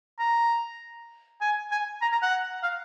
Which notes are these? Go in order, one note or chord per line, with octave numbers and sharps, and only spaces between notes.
A#5
G#5
G#5
A#5
A#5
F#5
F5